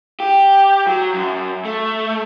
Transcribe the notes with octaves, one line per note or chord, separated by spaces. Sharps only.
G4
F#3
F#2
A3